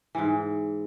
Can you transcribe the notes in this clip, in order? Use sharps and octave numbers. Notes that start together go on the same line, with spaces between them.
G#2 E3